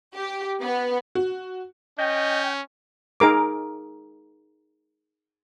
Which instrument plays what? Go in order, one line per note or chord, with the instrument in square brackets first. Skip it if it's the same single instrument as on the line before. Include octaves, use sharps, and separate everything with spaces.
[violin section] G4
B3
[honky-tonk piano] F#4
[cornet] C#4 [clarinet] D#5 [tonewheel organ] G5
[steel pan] D#4 G#4 A#4 D6